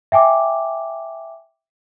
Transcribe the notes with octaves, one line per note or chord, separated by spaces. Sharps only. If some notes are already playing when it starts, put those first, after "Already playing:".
E5 G5 G#5 D6